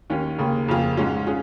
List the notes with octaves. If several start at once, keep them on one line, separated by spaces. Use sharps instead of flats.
D#2 D#3 C#4
D#2 C#3 A#3
F2 C#3 A#3 F4 G#4
G#2 G#3 C#4 F4
C#4 F4 G#4